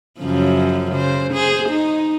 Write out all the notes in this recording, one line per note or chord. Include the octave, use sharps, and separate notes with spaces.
F#2 C#3 F3
C#3 C5
G#4 C5
D#4